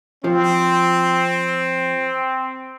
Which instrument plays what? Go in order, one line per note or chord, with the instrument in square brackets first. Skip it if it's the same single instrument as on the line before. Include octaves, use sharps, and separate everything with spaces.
[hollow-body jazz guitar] F3 [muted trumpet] C4